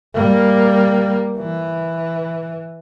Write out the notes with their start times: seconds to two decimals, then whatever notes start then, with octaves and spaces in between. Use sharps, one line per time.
0.15 G3 A#3
1.38 E3